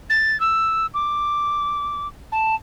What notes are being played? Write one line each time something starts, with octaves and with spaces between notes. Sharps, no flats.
A6
E6
D6
A5